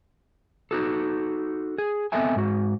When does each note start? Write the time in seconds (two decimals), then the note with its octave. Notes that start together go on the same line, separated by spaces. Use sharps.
0.71 D#4 F#4 A4
1.78 G#4
2.12 B3 C4 A4 D#5 E5 G#5
2.36 G#2 F#4